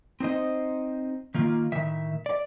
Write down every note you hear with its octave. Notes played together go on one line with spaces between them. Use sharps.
C4 D#4 C5 D#5
D#3 A#3 F4
A2 D#3 E5
D5